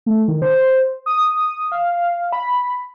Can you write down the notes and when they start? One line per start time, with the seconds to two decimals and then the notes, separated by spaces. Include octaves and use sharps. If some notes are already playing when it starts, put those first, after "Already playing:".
0.06 A3
0.28 D#3
0.42 C5
1.06 D#6
1.72 F5
2.32 B5